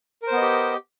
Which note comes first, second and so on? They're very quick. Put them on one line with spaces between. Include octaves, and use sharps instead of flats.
A#4 C5 B3 D#5 G4